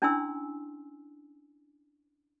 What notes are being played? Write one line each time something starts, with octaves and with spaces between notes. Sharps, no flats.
C#4 D4 E4 G#5 C6 E6